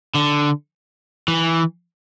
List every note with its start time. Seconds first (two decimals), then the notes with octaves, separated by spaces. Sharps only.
0.14 D3
1.28 E3